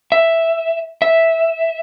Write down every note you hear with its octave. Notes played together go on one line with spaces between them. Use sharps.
E5
E5